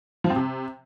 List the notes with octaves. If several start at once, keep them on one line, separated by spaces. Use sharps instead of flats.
F3
C4
C3